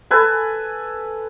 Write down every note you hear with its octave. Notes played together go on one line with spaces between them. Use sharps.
A4 B4 G#5